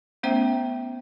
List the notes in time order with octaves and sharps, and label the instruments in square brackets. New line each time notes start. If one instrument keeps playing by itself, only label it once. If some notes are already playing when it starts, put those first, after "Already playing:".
[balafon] A3 B3 C#4 C5 E5 G5